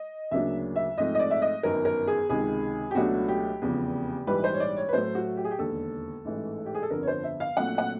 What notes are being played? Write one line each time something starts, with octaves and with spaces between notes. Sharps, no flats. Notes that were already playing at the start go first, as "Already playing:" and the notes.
Already playing: D#5
D2 C#3 F#3 A#3 D4 E5
E5
G#2 F3 A3 C4 D#5
D#5
D5
E5
D#5
G1 F#2 D#3 A#4
A#4
G#4
C#2 C3 D#3 G#3 G#4
G4
C#2 B2 F#3 A3 D4 F#4
G4
F1 E2 C#3 F3
A#1 G#2 E3 G3 B4
C5
C#5
D5
C#5
B4
A2 F#3 A3 C5
F#4
G4
G#4
G4
E1 D#2 D3 A4
A1 G#2 E3 A3
G4
G#4
A4
G1 F2 D3 F3 A#4
C#5
C5
E5
F5
A#1 A#2 F#3 A3 C4 F#5
F#5